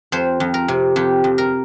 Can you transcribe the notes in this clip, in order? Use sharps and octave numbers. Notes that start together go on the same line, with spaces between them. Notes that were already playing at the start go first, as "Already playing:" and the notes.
F2 C5
F2
A#4
C3
F2 G4
F2
A#4